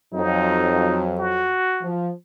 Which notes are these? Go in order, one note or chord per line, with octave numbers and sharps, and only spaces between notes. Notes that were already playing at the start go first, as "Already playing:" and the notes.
F2 F#3 D#4
F#4
F3